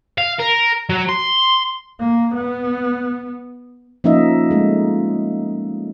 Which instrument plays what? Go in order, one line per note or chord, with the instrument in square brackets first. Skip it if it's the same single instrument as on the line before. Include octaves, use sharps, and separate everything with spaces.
[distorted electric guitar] F5
A#4
F#3
C6
[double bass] A#3
B3
[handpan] F3 A#3 C#4 D#4 D#5 E5
G#3 A3